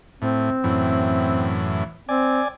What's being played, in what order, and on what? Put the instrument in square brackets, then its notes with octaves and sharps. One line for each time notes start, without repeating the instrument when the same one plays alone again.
[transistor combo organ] A2 [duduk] C4
[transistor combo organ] F#2 A2 E3
[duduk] C4 [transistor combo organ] D5 G#5